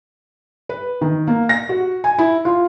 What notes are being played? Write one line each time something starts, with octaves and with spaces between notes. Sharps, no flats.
B4
D#3
A#3
A#6
F#4
G#5
E4
F4